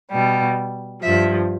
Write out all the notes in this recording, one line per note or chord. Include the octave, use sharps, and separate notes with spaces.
B2 G3
G2 F3 E5